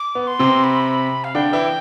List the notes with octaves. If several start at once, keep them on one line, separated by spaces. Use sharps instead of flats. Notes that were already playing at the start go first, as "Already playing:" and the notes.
Already playing: D6
B3
C6
C3 C4
B5
F5
D3 D4 G5
E3 E4